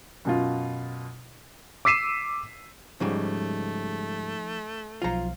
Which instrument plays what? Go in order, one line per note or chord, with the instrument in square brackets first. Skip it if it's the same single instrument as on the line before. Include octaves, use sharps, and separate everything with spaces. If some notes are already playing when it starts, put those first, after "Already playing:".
[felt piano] F#2 B2 F4
[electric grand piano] D6 E6 B6 C7 D#7 E7
[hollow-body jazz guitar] G#2 C#3 G3 [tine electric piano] F3 D#4 [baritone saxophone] A3
[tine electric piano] B1 F3 F5 [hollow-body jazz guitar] F4 A#5